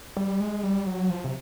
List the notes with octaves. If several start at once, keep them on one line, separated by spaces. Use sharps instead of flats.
G3
G#3
G3
F#3
F3
C3